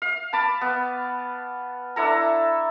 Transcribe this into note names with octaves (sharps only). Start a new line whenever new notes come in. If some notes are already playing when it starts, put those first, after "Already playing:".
F5
A5 B5 D6
B3
D4 E4 A4 A#5